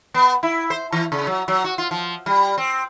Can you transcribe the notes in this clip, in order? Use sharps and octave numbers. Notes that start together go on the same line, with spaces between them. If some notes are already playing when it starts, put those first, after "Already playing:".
B3
E4
C5
E3
C#3
F#3
F#3
F#4
F4
F3
G3
C4